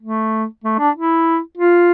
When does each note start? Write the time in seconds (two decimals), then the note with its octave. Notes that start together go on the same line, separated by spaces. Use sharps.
0.01 A3
0.64 A3
0.79 D4
0.95 E4
1.57 F4